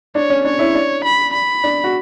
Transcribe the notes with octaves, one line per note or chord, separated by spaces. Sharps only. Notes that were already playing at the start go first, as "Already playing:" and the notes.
D4 C#5
C#4
D4 C#5
C#4 E4
D4
B5
B5
D4
F#4